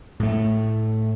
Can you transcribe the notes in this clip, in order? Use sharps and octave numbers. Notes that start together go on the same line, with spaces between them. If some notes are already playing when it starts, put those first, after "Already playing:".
A2 A3